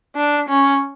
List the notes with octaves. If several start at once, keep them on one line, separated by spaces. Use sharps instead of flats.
D4
C#4